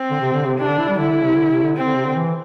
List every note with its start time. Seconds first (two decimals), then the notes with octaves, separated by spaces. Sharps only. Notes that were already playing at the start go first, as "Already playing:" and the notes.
Already playing: C4
0.10 D3
0.20 C3
0.33 D3
0.46 C3
0.59 C3 D4
0.69 D3
0.79 E4
0.89 G3
0.98 D3 E4
1.12 D3
1.24 C3
1.37 D3
1.51 C3
1.63 D3
1.76 C4
1.86 D3
1.96 C3
2.06 D3
2.15 E3